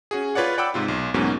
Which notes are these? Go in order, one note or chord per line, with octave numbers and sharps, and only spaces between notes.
C#4 F#4 G#4
F4 B4 C#5 D5 F#5
D5 F#5 G5 B5 D6 E6
G#2 C3 F4
B1
E2 G#2 B2 F#3 A#3 C#4